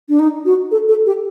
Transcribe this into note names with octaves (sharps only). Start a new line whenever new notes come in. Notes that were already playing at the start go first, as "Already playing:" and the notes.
D4
D#4
F#4
A4
A4
G4